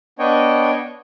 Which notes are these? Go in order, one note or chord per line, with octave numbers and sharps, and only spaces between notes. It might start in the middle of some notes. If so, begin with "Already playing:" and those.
B3 D4 C#5 D#5 G5